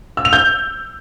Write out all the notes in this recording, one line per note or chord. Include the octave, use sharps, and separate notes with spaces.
E6
F7
G6